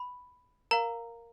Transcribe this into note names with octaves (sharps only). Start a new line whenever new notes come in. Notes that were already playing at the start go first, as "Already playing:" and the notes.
Already playing: B5
A#4 F5 A#5